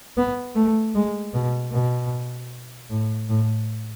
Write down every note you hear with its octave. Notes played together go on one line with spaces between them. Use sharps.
B3
A3
G#3
B2
B2
A2
A2